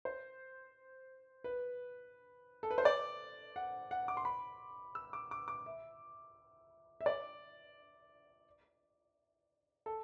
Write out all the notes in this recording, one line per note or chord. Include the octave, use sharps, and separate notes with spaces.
C5
B4
A4
B4
C5
D5
F#5
F#5
D6
C6
B5
E6
D6
D6
D6
E5
E5
D5
A4